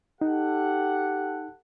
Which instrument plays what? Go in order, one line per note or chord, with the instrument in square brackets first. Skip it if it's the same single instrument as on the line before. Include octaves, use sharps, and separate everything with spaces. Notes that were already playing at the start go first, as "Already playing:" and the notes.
[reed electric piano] D#4 [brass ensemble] G4 A4 F#5